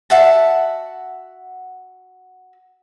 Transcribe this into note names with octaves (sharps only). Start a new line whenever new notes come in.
F#4 E5 F#5 A5